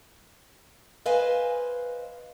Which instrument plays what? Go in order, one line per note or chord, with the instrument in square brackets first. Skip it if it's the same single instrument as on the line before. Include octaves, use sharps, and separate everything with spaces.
[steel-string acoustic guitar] B4 C5 D#5 F5 G#5